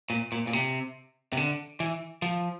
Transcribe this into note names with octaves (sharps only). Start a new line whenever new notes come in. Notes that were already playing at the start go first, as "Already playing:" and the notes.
A#2
A#2
A#2
C3
C3
D3
E3
F3